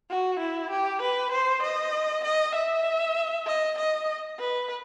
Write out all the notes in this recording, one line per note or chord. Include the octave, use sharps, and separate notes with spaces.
F#4
E4
G4
B4
C5
D#5
D#5
E5
D#5
D#5
B4